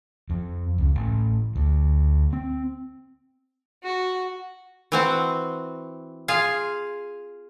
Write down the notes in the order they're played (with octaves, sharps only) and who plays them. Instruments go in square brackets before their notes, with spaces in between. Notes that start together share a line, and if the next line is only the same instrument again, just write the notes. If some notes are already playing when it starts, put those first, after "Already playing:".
[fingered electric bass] F2
C#2
A1
D2
C4
[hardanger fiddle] F#4
[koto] E3 C4 F#4
F4 G#4 F5